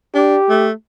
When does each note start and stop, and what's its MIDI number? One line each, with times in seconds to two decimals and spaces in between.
0.14 0.37 62
0.14 0.68 67
0.50 0.72 57